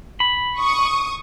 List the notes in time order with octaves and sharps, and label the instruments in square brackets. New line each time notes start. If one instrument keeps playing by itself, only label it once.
[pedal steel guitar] B5
[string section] C#6 D#6